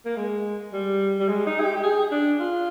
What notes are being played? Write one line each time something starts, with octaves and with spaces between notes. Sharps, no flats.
A#3
G#3
G3
G3
G#3
D#4
G#4
G4
G4
G#4
D4
F4